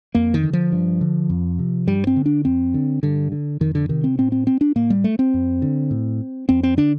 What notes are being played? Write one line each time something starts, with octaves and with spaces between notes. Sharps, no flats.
F2 A#3
D#3
D3
F3
G2
D3
F2
C3
G2 G3
C4
D3
D4
F2 C4
D3
G2 D3
D3
F2 D#3
D3
C3 D#3
C4
A2 C4
C4
C4
D4
A2 A#3
G3
A3
C4
F2
D3
A2
F2 C4
C4
D3 D4